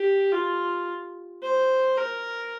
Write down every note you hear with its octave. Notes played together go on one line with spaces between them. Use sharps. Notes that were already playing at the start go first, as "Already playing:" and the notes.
Already playing: G4
F4
C5
A#4